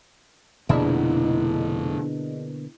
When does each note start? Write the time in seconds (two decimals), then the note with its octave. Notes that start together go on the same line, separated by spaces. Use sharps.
0.69 F1 B2 D3 A#3 D4 E4 G#4 D#5